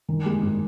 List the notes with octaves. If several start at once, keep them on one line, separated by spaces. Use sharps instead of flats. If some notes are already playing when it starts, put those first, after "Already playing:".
D#3
G#3
G#1